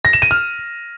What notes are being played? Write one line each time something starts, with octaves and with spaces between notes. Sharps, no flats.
A#6
E7
D#7
F6